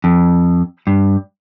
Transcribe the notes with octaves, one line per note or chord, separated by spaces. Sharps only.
F2
G2